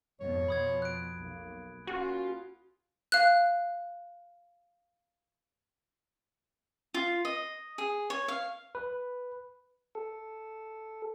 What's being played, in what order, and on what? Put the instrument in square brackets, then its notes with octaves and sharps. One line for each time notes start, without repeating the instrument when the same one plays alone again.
[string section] F2 G#2 B2 [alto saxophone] C#5
[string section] F2 B2 F3 [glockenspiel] B5 D#6 G#6
[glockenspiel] F#6 D7
[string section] B1 [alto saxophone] A#3
[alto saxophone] A#3 [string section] C#4 F4 [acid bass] F#4
[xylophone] F5 F#6
[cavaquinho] F4
D#5
G#4
C#5
F5
[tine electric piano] B4
[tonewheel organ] A4